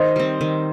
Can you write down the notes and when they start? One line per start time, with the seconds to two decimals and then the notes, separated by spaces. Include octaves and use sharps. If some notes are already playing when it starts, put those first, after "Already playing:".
Already playing: D#3 C5 D#5
0.16 G3 C4
0.41 D#3